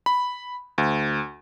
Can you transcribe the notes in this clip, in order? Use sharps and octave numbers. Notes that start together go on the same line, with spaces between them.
B5
D2